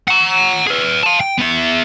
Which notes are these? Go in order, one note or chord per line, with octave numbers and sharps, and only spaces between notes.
F#5 A#5
G#4 B4
F5 A5
G5
B3 E5